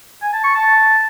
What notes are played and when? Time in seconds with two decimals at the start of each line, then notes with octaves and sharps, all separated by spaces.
0.22 G#5
0.33 A5
0.44 C#6
0.55 A5